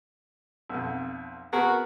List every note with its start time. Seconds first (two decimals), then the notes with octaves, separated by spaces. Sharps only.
0.70 B1 F2
1.53 B3 F#4 G#4 A#4